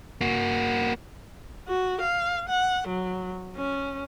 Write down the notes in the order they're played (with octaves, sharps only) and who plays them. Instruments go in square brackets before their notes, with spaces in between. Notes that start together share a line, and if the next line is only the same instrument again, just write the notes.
[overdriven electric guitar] A#3 F#4
[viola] F#4
F5
F#5
F#3
C#4